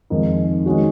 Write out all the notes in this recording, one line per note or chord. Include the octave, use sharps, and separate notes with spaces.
F2 D#3 G#3 D#4 A#4
D#3 G#3 C#4 F#4